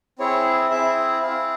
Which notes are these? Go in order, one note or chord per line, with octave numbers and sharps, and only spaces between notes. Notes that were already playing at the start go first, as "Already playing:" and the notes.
C4 E4 G#4 C#5
C4 E4 G#4 E5
C4 E4 G#4 F5